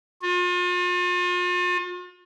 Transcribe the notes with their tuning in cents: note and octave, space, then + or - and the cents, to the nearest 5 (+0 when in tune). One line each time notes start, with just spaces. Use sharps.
F4 +40